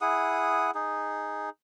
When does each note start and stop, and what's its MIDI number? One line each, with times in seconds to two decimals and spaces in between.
0.01 0.71 64
0.01 0.71 68
0.01 0.71 78
0.01 0.71 87
0.75 1.50 63
0.75 1.50 68